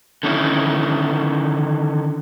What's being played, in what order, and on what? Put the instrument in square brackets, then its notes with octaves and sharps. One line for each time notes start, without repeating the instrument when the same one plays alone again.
[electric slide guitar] D3 D#3 C#4 E4